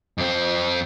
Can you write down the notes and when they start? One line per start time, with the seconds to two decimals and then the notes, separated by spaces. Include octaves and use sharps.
0.18 F2 C4